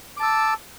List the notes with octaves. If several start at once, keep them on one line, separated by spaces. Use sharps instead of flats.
A5 D6 E6